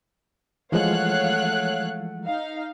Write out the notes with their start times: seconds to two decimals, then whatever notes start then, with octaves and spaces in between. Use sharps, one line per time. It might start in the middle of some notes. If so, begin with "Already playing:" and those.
0.72 E3 F3 G#3 A3 C#5 F5 F#5 F#6
2.25 D#4 F5